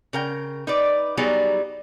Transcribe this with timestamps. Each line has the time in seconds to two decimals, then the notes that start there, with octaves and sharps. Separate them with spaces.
0.13 C#3 A#4 G5
0.67 D#4 B4 D5
1.17 F#3 G3 B3 D#4 G#4